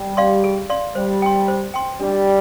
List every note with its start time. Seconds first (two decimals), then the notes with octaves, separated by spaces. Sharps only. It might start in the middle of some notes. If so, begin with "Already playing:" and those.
Already playing: G3
0.17 D5 F5 C6
0.44 G#4
0.70 D5 F5 C6
0.95 G3 C5
1.22 G5 C6
1.48 C5
1.74 G5 C6
2.00 G3 D4